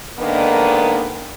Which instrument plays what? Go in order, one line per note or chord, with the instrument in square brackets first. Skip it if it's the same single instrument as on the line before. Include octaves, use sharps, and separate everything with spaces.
[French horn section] G#2 D3 D#3 A#3 B3 D4